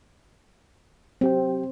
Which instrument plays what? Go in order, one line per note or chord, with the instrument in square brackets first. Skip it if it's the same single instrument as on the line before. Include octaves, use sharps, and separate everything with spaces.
[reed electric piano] F#3 G4 G5 [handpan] C4